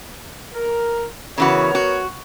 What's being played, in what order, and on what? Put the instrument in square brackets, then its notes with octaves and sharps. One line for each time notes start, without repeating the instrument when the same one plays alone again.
[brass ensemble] A#4
[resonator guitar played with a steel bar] C#3 E3 F#4 [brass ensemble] B3 A#4 C#5
[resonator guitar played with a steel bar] F#4